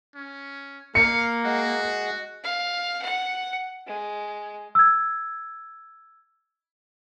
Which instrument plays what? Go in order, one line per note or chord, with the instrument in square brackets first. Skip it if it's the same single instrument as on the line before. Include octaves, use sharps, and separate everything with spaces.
[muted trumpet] C#4
[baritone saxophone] A#3 [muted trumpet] F5 [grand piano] C#7
[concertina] G#3 F#5 [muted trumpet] F#4
[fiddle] F5
F#5
G#3
[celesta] E6 G#6